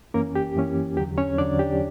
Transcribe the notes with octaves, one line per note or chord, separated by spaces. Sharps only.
F#2 E3 A#3 C#4 A#4
G4
F#2 E3 A#3 C#4
E2 D3 F#3 G4
C#4 C#5
E2 D3 F#3 D4 D5
G4